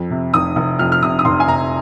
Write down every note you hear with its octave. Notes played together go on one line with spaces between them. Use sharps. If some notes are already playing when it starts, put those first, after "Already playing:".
Already playing: F2
C3
F1 D#6
F1
F2 F6
F6
C3 D#6
D#6
F1 C6
G#5
F1 A#5